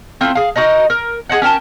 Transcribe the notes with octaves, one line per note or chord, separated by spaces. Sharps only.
A3 C4 E4 F4
G#4 F5
D#4 F#4 A#4 D#5
A#4
G#4 C5 D#5 F#5
C#4 A#4 G5 A5